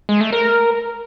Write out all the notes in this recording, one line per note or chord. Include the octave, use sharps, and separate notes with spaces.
G#3
A3
A#4